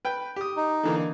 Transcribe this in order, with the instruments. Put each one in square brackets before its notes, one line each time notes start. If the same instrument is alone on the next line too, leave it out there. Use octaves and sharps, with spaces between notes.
[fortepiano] B4 G5
G4 D#6
[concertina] D#4
[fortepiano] D3 E3 A#3